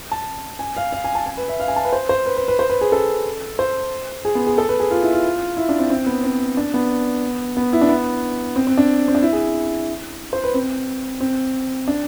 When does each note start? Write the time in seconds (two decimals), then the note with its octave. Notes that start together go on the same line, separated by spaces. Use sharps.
0.11 A5
0.59 G#5
0.77 F5
0.93 F5
1.04 G#5
1.15 A5
1.26 G#5
1.37 B4
1.48 E5
1.60 F5
1.68 G#5
1.76 A5
1.85 B4
1.93 C5
2.09 C5
2.26 B4
2.37 B4
2.48 B4
2.59 C5
2.70 B4
2.81 G#4
2.92 A4
3.59 C5
4.25 G#4
4.35 B3
4.47 G#4
4.58 A4
4.69 B4
4.80 G#4
4.91 F4
5.02 E4
5.13 F4
5.57 E4
5.69 D4
5.79 C4
5.90 C4
6.06 B3
6.24 C4
6.57 D4
6.74 B3
7.57 B3
7.73 E4
7.81 D4
7.89 B3
8.56 C4
8.67 C4
8.77 D4
9.08 C4
9.15 D4
9.22 E4
9.33 G#4
10.33 C5
10.44 B4
10.54 C4
11.20 C4
11.88 D4